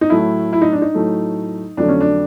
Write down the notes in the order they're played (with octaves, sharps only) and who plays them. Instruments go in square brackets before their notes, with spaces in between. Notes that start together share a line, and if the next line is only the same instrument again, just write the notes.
[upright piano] D#4
A2 F#3 A3 E4
E4
D#4
D4
D#4
A2 F#3 A3
F2 D3 F#3 A3 D4
C#4
D4